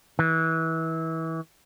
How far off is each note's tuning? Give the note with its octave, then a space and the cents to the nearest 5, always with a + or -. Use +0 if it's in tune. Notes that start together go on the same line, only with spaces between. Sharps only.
E3 -25